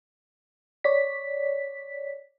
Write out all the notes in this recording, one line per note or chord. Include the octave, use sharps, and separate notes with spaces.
C#5 D5 B6